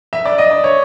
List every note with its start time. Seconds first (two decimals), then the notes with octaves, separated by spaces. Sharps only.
0.13 E5
0.25 D5
0.38 D#5
0.51 D5
0.64 C#5